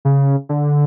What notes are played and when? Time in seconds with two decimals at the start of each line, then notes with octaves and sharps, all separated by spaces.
0.05 C#3
0.49 D3